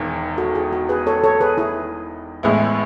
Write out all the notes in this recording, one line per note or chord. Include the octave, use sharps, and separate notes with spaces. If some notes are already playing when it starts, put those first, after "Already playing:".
Already playing: E1 E2 D#3
F#4 A4
E4 G#4
F#4
G#4 B4
A4 C#5
A4 C#5
G#4 B4
E4 G#4
A1 A2 G#3 B3 E4